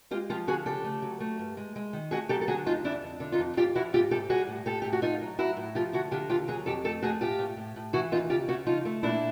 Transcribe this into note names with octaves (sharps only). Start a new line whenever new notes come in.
G#3 F4 G4
F3 F4 G4
D3 F#4 G#4
C#3 G4 A4
A3
F#3
A3
G2
G#3
G#3
D#3
A3 F#4 G#4
F#3 G4 A4
A4
D3 F#4 G#4
D2 D#4 F4
F2 D4 E4
F2
D3
D#4 F4
F2
G#2 F4 G4
F3 E4 F#4
G#2 F4 G4
G#2 G4 A4
G3 F#4 G#4
A2
A2 G4 A4
A2 G4
F#4
A2 D#4 F4
F#3
F#3 E4 F#4
A2
F3 F4 G4
D3 E4 F#4
D3 F4 G4
D#2 F4 G4
F#3 F#4 G#4
F2 G4 A4
A3 G4 A4
A3 F#4 G#4
A2 F4 G4
A2
A2
A2
E3 E4 F#4
D#2 D#4 F4
C#3 F4 G4
C#3 E4 F#4
F3 D#4 F4
A3
A#2 D4 E4